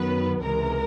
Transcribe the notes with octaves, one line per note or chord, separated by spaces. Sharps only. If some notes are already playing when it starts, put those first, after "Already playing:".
Already playing: F#2 D#3 F#3 B3 B4
C#2 C3 E3 G#3 A#4